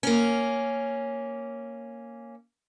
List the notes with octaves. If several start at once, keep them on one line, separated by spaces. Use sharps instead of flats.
A#3 C#4